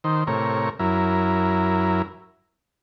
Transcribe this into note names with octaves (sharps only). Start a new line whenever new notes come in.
D#3 C5
A2 C3 A#4 C#5
F#2 E4 A#4